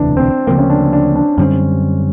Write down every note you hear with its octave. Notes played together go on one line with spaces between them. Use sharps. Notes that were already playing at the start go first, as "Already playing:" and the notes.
Already playing: E1 D2 C3 E3 D4
C4
D2 C#3 F3 A#3 C4
C#4
D4
D4
D4
F#2 D3 G3 C4 C#4